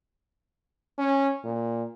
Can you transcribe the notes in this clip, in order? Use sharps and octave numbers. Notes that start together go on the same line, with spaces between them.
C#4
A#2